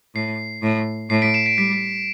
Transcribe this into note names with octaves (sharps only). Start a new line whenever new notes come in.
A2 C7
A2
A2 C7
B6 D7
C7 E7
B6 D7
G3 B6